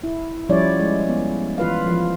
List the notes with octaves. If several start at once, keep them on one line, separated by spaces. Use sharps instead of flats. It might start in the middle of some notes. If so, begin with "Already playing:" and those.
E4
F3 G3 C#4 E4 C#5 D5
G#3
B3
E3 F4 B4 F5
F3